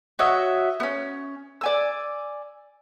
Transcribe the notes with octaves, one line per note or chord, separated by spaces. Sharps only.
F#4 C#5 D#5 E5
B3 C#4
D5 G#5 E6